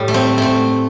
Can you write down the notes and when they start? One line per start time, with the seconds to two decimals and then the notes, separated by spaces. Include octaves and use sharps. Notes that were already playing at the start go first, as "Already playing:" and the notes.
Already playing: A2 G3
0.08 A3
0.14 C4
0.38 A3 C4